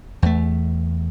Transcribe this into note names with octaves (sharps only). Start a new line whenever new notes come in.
E2 A3